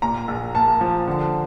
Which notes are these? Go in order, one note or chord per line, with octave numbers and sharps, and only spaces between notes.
A#2 A#5
A#1
A#3 A5
F3
D3